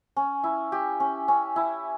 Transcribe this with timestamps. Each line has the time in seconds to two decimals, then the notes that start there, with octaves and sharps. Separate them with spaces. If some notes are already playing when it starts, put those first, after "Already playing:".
0.16 C#4
0.44 E4
0.72 G4
1.00 C#4
1.28 C#4
1.56 E4